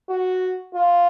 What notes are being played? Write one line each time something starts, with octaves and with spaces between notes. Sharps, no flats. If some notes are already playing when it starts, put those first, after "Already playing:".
F#4
F4